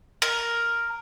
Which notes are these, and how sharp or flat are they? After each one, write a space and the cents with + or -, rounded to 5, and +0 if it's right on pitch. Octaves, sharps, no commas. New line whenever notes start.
A#4 +0